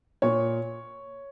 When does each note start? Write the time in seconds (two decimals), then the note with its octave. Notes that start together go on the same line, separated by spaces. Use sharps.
0.22 A#2 C#5